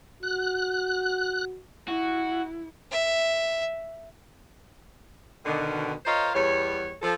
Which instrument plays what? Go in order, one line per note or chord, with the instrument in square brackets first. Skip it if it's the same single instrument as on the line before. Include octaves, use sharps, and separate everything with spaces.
[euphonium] F#4 [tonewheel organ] F#6
[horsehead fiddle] E4 [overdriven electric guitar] F#4
[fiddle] E5
[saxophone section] B2 D3 D#3
F4 A#4 C5 C#5 D#5 F5
E2 G3 C#5
F3 A4